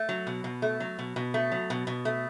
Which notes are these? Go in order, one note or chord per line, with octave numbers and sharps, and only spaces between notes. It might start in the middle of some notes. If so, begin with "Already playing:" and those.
Already playing: A3
F#3
B2
B2
A3
F#3
B2
B2
A3
F#3
B2
B2
A3